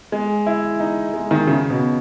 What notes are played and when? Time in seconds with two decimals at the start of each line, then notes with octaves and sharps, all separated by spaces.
0.12 G#3
0.47 E4
0.80 D#4
1.14 G#3
1.31 D#3
1.47 C#3
1.70 B2